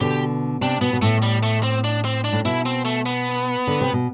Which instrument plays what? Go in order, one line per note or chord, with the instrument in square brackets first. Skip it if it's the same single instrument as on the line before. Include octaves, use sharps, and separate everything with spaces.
[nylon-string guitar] B2 D3 [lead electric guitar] G4
[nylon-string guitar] C3 [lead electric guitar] D4
[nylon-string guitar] B2 [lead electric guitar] B3
[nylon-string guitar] B2
[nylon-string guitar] A2 [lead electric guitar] A3
[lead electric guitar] G3
A3
C4
D4
C4
D4
[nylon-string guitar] A2
[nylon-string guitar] B2 [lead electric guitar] E4
[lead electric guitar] C4
A3
B3
[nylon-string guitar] D3
C3
B2